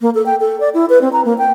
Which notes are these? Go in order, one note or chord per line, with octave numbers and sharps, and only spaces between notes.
A#3
A4
G5
A4
D5
E4
B4
C4
A#5
A#3
G5